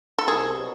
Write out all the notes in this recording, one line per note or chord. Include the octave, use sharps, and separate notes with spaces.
A4
C2 G#4
B2 F#3